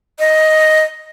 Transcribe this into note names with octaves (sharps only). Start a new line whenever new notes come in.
D#5